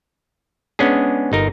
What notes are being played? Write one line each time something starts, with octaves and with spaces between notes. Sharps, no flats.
G#3 B3 C#4 D4 G#4
G1 D#4 A#4